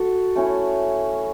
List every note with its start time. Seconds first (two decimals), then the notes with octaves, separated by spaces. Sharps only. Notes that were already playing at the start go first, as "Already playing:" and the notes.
Already playing: F#4 A4
0.36 A3 C#4 E4